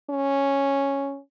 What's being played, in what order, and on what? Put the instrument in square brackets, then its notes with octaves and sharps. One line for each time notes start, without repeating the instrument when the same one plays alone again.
[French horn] C#4